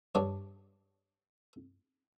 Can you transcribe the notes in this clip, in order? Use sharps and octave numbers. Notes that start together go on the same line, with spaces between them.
G2 D4 C#5